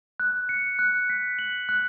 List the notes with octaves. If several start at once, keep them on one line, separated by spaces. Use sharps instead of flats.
F#6
C#7
F#6
B6
F#7
F#6